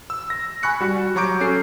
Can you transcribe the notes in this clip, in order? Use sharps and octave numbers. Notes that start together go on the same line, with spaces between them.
E6
A#6
G#5 B5 C#6 F#6 C#7
G3 F#4
F#3 A#5 C#6 D6 G6 D7
C#4 A4 C7